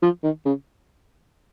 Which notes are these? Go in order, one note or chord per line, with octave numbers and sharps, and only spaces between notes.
F3
D#3
C#3